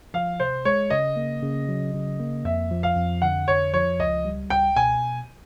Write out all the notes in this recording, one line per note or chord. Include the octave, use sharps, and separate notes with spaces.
F3 F5
C3 C5
G#3 C#5
C#3 D#5
A#3
C#3
F#3
C#3
A#3
F2 E5
F3
F5
F2
D3 F#5
F2 C#5
F3 C#5
C#2 D#5
G3
C#2 G5
B2 G#5